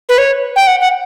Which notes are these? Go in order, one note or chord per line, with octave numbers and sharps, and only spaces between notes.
B4
C#5
G5
F#5
F#5